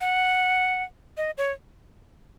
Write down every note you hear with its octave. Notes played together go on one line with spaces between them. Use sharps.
F#5
D#5
C#5